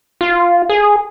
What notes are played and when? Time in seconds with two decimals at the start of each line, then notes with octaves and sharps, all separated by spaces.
0.21 F4
0.69 G#4